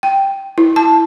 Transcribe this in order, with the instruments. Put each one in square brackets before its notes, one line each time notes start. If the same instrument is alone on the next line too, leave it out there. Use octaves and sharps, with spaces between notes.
[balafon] G5
E4
A5